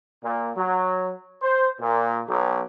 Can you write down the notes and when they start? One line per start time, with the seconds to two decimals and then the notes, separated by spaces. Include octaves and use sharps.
0.24 A#2
0.56 F#3
1.42 C5
1.81 A#2
2.27 B1